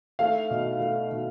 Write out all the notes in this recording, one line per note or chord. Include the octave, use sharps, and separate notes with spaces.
A3 F5
B2
A3
B2